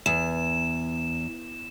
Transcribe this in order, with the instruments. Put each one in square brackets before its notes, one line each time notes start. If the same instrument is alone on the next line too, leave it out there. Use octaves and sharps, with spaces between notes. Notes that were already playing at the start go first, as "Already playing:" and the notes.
[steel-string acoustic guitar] E2 [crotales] E7